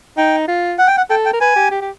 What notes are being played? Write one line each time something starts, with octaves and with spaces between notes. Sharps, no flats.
D#4 G5
F4
F#5
G5
F#5
A4 G5
G5
A#4
B4 G#5
G4
G4
G4